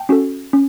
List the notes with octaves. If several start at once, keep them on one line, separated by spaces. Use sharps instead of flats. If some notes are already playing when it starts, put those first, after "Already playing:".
Already playing: G5 A5
C#4 F#4 A4
C#4